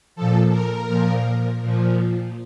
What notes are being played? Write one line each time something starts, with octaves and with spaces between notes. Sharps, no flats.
A#2 F3 A4
A#4
A#2 F3
A#2 F3